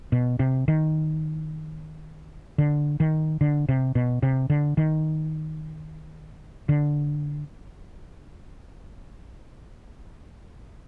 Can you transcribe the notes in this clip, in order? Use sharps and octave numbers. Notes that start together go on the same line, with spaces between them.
B2
C3
D#3
D3
D#3
D3
C3
B2
C3
D3
D#3
D3